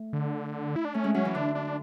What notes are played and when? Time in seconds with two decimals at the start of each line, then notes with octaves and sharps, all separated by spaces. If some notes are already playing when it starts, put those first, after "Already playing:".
Already playing: A3
0.13 D3
0.76 E4
0.85 D4
0.94 A3 C#4
1.04 G#3
1.14 F#3 C#4
1.25 E3
1.35 D3 D4
1.55 D4